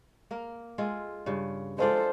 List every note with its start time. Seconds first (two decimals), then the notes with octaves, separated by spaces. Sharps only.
0.31 A#3 A#4
0.78 G#3 F4 A4
1.26 G2 C#3
1.78 G#3 F4 A4 C5 D5